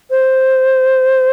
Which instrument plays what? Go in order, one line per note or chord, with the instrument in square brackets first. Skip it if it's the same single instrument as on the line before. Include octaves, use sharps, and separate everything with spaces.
[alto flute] C5